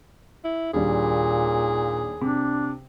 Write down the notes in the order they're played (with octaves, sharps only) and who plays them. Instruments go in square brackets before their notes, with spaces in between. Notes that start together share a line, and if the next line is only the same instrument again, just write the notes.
[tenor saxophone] E4
[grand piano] D#2 G3 D4 [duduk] A#2 [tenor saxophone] G#4
[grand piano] C3 [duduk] D4